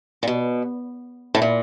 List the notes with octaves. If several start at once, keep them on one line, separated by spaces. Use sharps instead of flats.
A#2
B2
A2
A#2